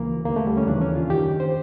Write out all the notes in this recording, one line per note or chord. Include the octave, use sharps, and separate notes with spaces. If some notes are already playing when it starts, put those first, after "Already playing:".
Already playing: D2 C#3 E3 A#3
D#2 D3 A#3
A3
G3
C#4
D#2 C#3 E3 D4
C#4
F4
F#2 D#3 G4
C5